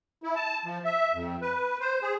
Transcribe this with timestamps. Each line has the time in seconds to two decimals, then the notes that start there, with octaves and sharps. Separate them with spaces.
0.23 E4
0.36 A5
0.65 F3
0.85 E5
1.14 F2
1.42 B4
1.80 C5
2.02 G#4